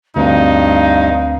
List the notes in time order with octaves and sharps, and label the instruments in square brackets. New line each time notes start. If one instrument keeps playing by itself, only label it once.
[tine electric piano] D2 C4 [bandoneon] G2 [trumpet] D#4 [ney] F5